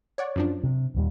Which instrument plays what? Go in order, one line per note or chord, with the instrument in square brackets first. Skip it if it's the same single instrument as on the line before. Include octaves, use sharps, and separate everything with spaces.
[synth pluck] C#5 D5 F#5
F#2 F3 D4
[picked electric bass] C3
D#1 D#2 G3